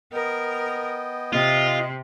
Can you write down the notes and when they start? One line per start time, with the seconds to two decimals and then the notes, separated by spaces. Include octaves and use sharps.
0.13 B3 A#4 D#5 G5
1.33 C3 F4 D#5